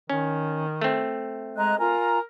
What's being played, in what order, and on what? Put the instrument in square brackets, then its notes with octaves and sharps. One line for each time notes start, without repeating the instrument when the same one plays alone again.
[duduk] D#3 [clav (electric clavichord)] C#4
[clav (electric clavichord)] A3 C4
[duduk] G#3 [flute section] D#5 A#5 F#6
[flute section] F4 G#5 A#5 [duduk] A#4